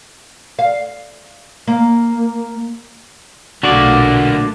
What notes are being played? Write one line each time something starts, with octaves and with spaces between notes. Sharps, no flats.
F5
A#3
B1 A#2 D3 A3 A#3 D4 F#4 D5